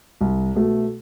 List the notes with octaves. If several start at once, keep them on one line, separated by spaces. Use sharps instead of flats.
C2
B2 A3